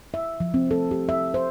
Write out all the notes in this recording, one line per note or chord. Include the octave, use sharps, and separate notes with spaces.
E5
F3
C4
A4
G4
E5
C5